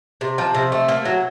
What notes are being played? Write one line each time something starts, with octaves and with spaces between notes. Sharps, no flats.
C3
F3
C3
A3
A#3
F#3